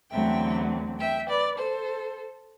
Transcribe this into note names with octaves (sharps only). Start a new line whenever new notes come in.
E2 D3 F#3 A3 C4 E5 G5
E5 G5
B4 D5
A4 C5